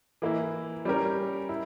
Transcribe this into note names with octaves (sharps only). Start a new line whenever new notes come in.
E3 A#3 E4
G3 C#4 G4 A#4
E4